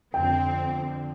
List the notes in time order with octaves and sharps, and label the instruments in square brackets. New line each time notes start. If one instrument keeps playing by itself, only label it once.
[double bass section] F2 D3 [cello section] C4 [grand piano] G5